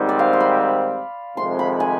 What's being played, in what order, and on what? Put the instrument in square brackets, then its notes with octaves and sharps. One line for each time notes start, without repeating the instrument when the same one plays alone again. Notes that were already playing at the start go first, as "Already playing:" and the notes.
Already playing: [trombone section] G#2 D#3 G3 C4
[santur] D5
F5
C6
B5
[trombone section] F2 C3 D#3 G#3 [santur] C6
[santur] B5
G#5